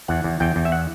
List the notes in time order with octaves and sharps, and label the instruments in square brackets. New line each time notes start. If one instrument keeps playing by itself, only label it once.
[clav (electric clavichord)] E2 F#5
E2
E2 G5
E2
E5
F#5